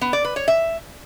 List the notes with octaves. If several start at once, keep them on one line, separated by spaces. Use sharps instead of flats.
B3
D5
B4
C#5
E5